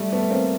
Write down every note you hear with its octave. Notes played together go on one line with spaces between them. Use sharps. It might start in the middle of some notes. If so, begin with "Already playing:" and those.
Already playing: G3 A3
A3 B3
A#3 C4